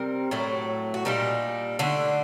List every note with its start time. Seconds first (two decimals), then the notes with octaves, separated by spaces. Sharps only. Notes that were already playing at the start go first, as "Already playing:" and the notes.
Already playing: C3 G3 C4 A#4
0.31 A2 F#3 A3
0.94 F#4
1.05 A#2 G3 D4 D#4
1.79 D3 A3 D4